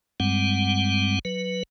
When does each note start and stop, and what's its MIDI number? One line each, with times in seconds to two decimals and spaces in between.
0.20 1.19 43
0.20 1.19 55
0.20 1.19 56
0.20 1.19 60
0.20 1.19 78
1.25 1.63 54
1.25 1.63 71